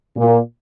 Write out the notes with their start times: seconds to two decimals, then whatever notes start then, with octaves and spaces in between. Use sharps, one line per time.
0.17 A#2